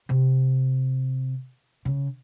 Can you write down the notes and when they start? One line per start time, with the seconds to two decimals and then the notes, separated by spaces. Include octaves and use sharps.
0.09 C3
1.85 C#3